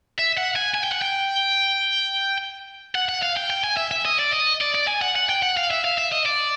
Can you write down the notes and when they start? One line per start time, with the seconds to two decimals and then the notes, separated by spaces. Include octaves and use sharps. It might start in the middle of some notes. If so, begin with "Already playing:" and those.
0.19 E5
0.38 F#5
0.56 G#5
0.74 G#5
0.84 G5
0.92 F#5
1.02 G5
2.95 F#5
3.09 F#5
3.22 F5
3.36 G5
3.50 G5
3.64 G#5
3.77 E5
3.91 E5
4.05 D#5
4.19 D5
4.33 D#5
4.61 D5
4.75 D5
4.87 G#5
5.01 F#5
5.15 F#5
5.29 G5
5.42 F#5
5.57 F5
5.70 E5
5.84 F5
5.98 E5
6.12 D#5
6.25 D5